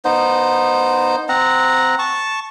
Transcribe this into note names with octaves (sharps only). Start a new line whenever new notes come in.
B3 D#4 C5
C4 F#5 A#5
A5 C#6